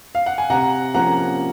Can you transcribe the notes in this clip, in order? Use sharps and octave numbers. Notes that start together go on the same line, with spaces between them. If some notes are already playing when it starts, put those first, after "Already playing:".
F5
F#5
G#5
C3 F#5 A#5
F3 A#3 C#4 F#5 A#5